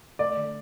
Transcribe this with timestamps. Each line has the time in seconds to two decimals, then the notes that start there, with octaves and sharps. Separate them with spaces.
0.19 A3 D5
0.37 D3